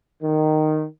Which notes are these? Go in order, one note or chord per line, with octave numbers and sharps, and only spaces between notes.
D#3